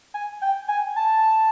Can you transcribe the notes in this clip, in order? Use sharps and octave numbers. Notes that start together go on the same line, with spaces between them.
G#5
G5
G#5
A5